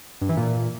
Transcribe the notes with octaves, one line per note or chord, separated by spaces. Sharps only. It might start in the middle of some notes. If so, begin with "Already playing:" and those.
G2
E3
A#2